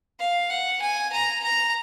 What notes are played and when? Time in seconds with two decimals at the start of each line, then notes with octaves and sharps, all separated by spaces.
0.19 F5
0.50 F#5
0.81 G#5
1.12 A#5
1.43 A#5